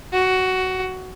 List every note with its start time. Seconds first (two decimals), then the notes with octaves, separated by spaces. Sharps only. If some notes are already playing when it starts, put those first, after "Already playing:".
0.12 F#4